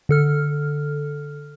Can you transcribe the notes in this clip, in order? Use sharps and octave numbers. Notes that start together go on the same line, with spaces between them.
D3 A4 F6